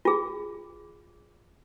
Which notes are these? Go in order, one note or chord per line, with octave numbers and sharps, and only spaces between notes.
F4 G#4